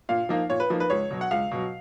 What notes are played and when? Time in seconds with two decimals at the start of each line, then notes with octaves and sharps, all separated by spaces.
0.09 A#2 F5
0.29 F3 A#3 D#4
0.49 A#2 C#5
0.60 B4
0.70 F3 A#3 D#4
0.80 B4
0.90 C#2 C#5
1.10 B2 F#3
1.21 F#5
1.31 C#2 F5
1.51 B2 F#3